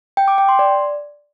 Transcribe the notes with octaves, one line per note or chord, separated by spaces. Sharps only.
G5
D6
G5
C6
D5